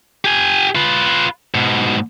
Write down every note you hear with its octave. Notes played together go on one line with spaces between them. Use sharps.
G4 G#5
F4 B4
G#2 B2